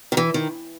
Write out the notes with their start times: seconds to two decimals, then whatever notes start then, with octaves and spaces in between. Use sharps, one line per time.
0.12 D#3
0.17 E3
0.34 D#3